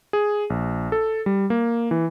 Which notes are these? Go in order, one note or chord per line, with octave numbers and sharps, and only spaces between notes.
G#4
A#1
A4
G3
A#3
E3